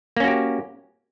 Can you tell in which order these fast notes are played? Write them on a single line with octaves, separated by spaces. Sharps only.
A#3 C#4 F#4 G4